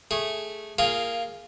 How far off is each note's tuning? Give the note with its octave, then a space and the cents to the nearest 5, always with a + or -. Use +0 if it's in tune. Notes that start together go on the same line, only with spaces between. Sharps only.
A3 -5 G#4 -5
A#3 -10 F4 +0 G#4 +0